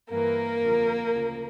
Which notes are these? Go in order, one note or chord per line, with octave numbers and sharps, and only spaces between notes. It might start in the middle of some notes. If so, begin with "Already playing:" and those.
G2 E3 A#3 A#4
F2 D3 F3
D2 C#3 F3